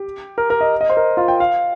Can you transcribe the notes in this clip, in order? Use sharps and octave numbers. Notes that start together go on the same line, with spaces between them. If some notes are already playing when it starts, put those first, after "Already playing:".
Already playing: G4
A#4
A#4
D#5
D#5
C5
A#4
F4
G5
F5